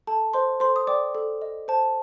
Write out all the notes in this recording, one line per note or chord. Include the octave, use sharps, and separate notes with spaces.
A4 A5
C5 D#5 C6
A4 C5 C6
D#6
D5 G5 D6
A4
D#5
C5 A5